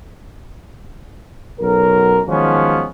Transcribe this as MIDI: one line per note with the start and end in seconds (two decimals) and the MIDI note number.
1.60 2.21 35
1.60 2.21 42
1.60 2.21 54
1.60 2.21 70
2.27 2.85 51
2.27 2.85 53
2.27 2.85 54
2.27 2.85 56
2.27 2.85 59
2.27 2.85 61